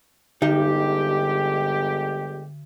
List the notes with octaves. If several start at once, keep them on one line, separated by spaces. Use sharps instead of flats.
G1 D3 G#3 D#4 G4 G5